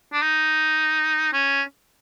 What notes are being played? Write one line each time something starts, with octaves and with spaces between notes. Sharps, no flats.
D4
D#4
C#4